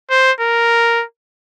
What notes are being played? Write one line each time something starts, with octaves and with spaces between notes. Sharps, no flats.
C5
A#4